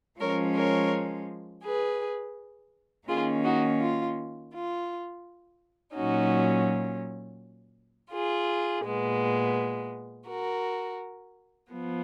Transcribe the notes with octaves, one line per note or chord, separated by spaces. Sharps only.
F3 G#3 C#4 A#4 C#5
A#4 C#5
G#4 B4
D#3 A#3 C#4 F4 G#4
D#4 F#4
F4
F4
A#2 F#3 C#4 D#4 F#4
F4 G#4
A#2 G#3 B3
F#4 A#4
F3 B3